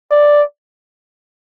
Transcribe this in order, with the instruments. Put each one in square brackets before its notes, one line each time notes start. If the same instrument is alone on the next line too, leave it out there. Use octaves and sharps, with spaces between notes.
[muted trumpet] D5